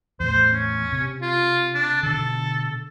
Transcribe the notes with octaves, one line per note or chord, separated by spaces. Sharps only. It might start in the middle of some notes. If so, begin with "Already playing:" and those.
E2 A2 C5
C#4
C3
F4
D4
B2 D3 A4